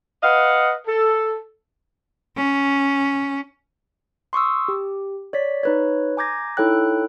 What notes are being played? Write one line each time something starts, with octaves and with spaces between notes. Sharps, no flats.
B4 D#5 F5 F#5
A4
C#4
C6 C#6 D#6 E6
G4
C#5 D5 B6
D#4 B4 C#5
G#5 A#5 D6 G6 G#6 A#6
D#4 E4 A4 C#5 G5 F#6